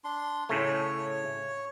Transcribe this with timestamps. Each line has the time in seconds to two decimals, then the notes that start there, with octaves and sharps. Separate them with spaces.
0.04 D4 C6
0.49 A2 C#3 A3 C#5